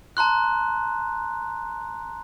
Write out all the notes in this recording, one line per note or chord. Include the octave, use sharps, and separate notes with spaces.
A5 A#5 C6 F#6